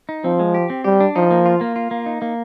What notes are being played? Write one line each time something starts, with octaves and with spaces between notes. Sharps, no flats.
D#4
F3 C4
G#3
G4
C4
G3 G4
D4
F3 D#4
A#3
F4
A#3
F4
A#3
D#4
A#3